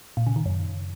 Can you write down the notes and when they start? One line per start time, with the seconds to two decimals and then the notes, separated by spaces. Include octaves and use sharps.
0.17 A#2
0.27 C#3
0.36 D#3
0.46 F#2